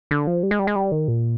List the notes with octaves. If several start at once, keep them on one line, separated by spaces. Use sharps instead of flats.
D3
F3
G3
G#3
G3
G#3
G3
D#3
A#2